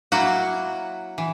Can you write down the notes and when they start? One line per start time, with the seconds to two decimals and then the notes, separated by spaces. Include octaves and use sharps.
0.12 F#3 A#3 E4 F#4
1.18 E3